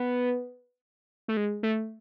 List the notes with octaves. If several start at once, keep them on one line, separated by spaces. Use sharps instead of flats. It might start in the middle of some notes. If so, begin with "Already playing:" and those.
Already playing: B3
A3
G#3
A3